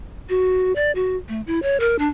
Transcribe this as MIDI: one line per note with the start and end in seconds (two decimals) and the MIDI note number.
0.29 0.73 66
0.75 0.91 74
0.95 1.16 66
1.29 1.41 57
1.47 1.59 64
1.62 1.77 73
1.80 1.98 70
1.99 2.09 62